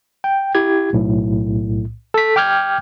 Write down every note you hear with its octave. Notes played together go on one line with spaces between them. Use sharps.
G5
E4 G4 G#6
B1 A2
A4 B6
G5 D6 F6 G6 G#6